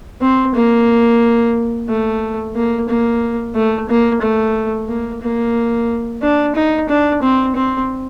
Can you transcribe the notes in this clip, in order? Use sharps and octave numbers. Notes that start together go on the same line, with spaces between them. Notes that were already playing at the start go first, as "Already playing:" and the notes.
C4
A#3
A3
A#3
A#3
A3
A#3
A3
A#3
A#3
D4
D#4
D4
C4
C4